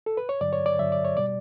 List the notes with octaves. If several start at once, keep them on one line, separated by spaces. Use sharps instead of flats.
A4
B4
C#5
G2 D3 F#3 D5
C#5
D5
G2 D3 F#3 E5
D5
C#5
B2 G3 D5